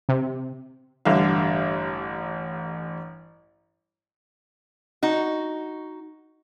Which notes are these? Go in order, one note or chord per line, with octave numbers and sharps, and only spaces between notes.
C3
A1 G2 D3 E5 F5
D#4 F#4